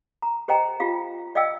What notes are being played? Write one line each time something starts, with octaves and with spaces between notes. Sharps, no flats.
A#5
G4 C5 D#5 G5 A#5
F4 G4 F5
D5 D#5 F5 G5 E6